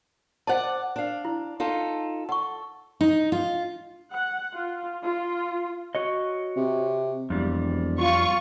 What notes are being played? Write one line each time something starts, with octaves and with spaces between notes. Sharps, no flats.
C5 D5 D#5 F#5 A5
D4 F5
E4
D#4 F4 A4
A4 F#5 C#6
D#4
F4
F#5
F4
F4
F#4 C#5 D#5
C3
E1 F2 G3
F4 C#6